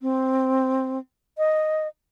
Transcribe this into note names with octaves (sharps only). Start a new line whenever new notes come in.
C4
D#5